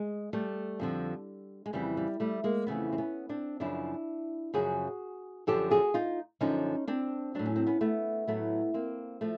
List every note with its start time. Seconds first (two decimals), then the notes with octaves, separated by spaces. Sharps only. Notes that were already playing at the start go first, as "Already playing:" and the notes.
Already playing: G#3
0.33 G3 A3
0.80 F2 D3 F3
1.66 G#3
1.73 F2 C#3 E3 G3
1.97 G3
2.20 G3 A3
2.44 G#3 A#3
2.67 F2 C#3 E3 A3 B3
2.93 C4
2.98 B3 C#4
3.29 C4 D4
3.60 F#2 C#3 F3 D4 E4
4.54 F#2 C#3 F3 F#4 G#4
5.47 F#2 D3 F3 G4 A4
5.71 F#4 G#4
5.94 D#4 F4
6.41 F#2 D3 F3 C#4 D#4
6.88 C4 D4
7.35 A2 F#3 D4
7.46 C#4
7.56 C4
7.67 B3 C#4
7.81 A3 B3
8.27 A2 F#3 A3 B3
8.74 A#3 C4
9.21 F3 A3